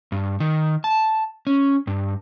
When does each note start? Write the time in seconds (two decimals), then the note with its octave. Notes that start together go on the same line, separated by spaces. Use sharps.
0.12 G2
0.40 D#3
0.84 A5
1.47 C#4
1.87 G2